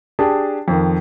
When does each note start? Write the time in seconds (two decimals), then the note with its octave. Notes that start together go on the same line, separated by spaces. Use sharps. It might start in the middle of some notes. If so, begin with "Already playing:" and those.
0.19 D4 G4 G#4 A5
0.68 F2 D#3